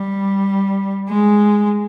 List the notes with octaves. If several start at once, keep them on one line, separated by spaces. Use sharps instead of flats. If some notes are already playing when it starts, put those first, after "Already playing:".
Already playing: G3
G#3